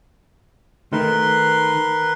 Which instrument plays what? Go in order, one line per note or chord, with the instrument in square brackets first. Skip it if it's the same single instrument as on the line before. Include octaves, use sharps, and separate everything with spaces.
[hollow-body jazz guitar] D#3 A3 [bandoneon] A#4 B4 C6